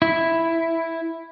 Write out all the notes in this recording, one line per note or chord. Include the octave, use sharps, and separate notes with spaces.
E4